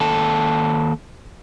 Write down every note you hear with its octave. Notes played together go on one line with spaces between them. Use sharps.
D#2 A4